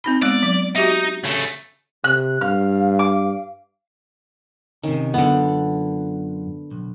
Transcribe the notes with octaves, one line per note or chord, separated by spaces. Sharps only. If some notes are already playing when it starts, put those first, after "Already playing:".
C4 D#4 B5
G#3 B3 D5
F#3 D6
D#4 F#4 G4 E5
C#2 A3
C3 F#6
G2 F5 F6
D6
C3 D#3 C#4
F#2 D3 B3 F4 F#5
B1